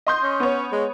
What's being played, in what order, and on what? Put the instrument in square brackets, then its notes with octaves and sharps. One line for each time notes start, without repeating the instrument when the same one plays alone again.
[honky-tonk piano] D#5 C6 G6
[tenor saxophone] C#4
[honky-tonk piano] B3 C#5
[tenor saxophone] G#3